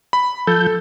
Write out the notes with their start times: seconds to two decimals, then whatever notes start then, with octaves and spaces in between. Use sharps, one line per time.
0.13 B5
0.47 F3 A4 G6